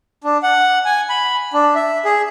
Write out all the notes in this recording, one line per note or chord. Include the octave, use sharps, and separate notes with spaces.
D4
F#5
G#5
B5
D4
E5
G#4